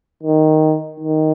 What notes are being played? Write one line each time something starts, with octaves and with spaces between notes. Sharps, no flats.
D#3
D#3